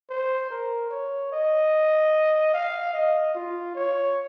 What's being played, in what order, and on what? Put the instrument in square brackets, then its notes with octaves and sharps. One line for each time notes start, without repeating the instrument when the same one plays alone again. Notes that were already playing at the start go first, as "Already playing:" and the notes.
[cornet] C5
A#4
C#5
D#5
F5
D#5
F4
C#5